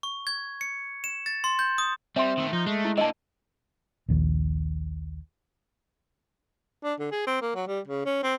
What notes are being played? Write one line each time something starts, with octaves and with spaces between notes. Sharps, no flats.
C#6
G#6
C#7
E7
A6
C6
G6
D#6
G3 C4 E5 C6
D#3 A3
F3 D#4
G#3 A3
E4
D3 A#3 D#5 A5
A#1 D#2 A#2
D4
D3
G#4
C4
A#3
F#3
G3
C#3
C#4
C4